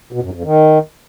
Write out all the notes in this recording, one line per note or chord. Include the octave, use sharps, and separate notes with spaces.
B2
F#2
F2
D#3